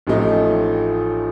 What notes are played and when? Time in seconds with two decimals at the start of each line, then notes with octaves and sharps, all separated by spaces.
0.07 A1 A2 F3 A3 D#4